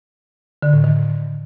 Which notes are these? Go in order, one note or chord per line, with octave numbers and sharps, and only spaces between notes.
D3
A2
D#3